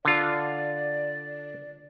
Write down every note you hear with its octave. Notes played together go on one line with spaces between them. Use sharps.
D3 F4 D5